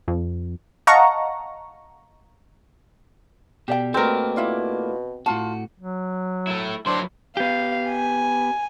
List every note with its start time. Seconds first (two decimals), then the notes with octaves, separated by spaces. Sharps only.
0.08 F2
0.87 D#5 F5 F#5 A5 A#5 C#6
3.68 B2 G4 D5 G5
3.94 B2 A3 A#3 C4 A#4
4.36 E4 F4 D5
5.26 A2 F4 F#4 A5
5.79 F#3
6.47 A3 E4
6.86 F#3 D4 E4 C5 C6
7.37 B3 G4 F5
7.90 G#5